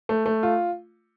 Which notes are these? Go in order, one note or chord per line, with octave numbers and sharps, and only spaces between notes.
A3
A3
F4